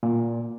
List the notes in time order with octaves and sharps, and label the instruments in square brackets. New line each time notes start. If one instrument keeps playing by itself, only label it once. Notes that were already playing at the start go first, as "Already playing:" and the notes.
[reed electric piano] A#2